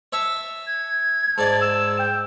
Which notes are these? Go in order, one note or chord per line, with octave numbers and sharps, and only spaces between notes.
C#5 E5 A5
G#6
G#2 D5 A5
E6
G5